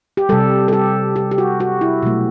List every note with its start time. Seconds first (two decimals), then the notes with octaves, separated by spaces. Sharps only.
0.17 G4
0.29 C3 G3 A4
0.68 A4
0.73 G4
1.16 G4
1.31 G4
1.38 F#4
1.60 F#4
1.81 E4
2.03 B2 F#3 A3